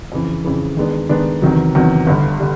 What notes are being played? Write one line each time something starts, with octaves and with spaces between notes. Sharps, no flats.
F2 C#3 E3
F2 C#3 E3
D#3 G#3 B3 D4
D#3 G#3 B3 D4
E2 C3 D#3 F#3
E2 C3 D#3 F#3
G1 G2 D3 G3
D3 G3